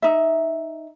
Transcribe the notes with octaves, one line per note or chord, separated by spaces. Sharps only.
D#4 E5